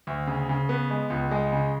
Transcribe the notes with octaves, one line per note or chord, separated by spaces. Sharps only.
D2
C#3
C#3
B3
G#3
C#2
G#3
C#3